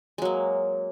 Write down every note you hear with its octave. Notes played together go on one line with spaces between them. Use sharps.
F#3 G#3 A#3